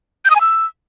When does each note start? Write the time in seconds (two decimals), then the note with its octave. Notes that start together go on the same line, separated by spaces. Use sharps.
0.25 G6
0.30 D#6
0.35 G#5
0.41 E6